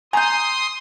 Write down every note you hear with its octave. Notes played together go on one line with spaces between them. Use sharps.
G#5 A#5 C6 D#6 G6